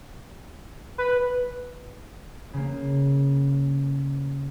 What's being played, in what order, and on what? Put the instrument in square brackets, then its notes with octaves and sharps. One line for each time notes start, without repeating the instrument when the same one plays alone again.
[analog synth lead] B4
[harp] C#3 A#3